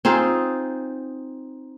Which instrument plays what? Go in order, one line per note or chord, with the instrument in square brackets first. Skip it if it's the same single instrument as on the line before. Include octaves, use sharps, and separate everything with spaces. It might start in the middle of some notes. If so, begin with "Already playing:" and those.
[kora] C4 D#4 F4 G#4